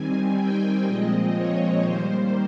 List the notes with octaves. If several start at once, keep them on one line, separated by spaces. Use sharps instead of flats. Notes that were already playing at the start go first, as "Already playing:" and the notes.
Already playing: D#3 G3 C4 G#5
G5
A#2 F3 G#3 C4 D#5
C#5
D#3 G3 A#3 C5